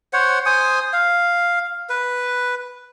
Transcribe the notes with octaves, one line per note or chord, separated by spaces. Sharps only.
C5 C#5 F#5
C5 G#5 D#6
F5
B4